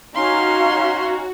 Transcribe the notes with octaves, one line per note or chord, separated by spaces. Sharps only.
C#4 D#4 F#4 F5 A#5 C6